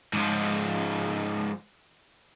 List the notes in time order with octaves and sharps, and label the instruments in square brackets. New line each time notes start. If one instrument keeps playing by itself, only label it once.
[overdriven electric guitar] G#2 F3